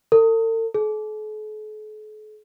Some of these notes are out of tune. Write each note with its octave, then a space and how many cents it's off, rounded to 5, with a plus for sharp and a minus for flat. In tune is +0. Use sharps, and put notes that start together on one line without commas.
A4 +45
A4 -45